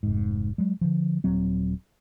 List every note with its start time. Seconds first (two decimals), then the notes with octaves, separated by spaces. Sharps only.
0.03 F1 G#2
0.58 F#3 G#3
0.81 D3 F3
1.24 D#1 F#3 C4